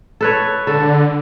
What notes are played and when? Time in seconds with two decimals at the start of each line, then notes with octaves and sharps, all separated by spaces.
0.21 A4 B4 C#5
0.67 D3 A4